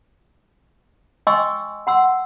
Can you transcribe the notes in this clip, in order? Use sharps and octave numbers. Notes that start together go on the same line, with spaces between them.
D#5 G5 G#5 C6 C#6 E6
F#5 C6 E6